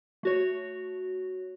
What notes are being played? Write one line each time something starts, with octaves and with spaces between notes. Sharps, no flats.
A3 F#4 C#5